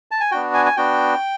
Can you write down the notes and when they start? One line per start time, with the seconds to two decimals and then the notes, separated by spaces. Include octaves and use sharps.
0.11 A5
0.21 G#5
0.31 B3 D4 F#4 G5
0.54 G#5
0.66 G#5
0.77 B3 D4 F#4 G5